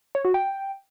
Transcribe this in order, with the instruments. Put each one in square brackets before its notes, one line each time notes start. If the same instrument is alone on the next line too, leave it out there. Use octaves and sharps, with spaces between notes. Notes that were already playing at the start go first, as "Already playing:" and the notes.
[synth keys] C#5
F#4
G5